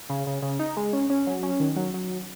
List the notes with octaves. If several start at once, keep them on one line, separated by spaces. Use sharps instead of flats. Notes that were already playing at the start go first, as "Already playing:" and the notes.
C#3
C#3
C#3
D#4
G#3
C#4
C#4
F#3
C#4
D#3
F#3
F#3